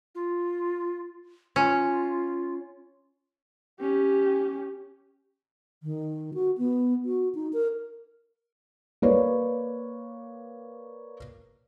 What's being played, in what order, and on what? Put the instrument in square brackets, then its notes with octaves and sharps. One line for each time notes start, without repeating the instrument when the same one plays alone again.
[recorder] F4
[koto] C#4 [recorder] F4
[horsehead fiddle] C#4 G4
[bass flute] D#3
F#4
B3
F#4
D#4
A#4
[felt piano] A#3 B4 C#5 D5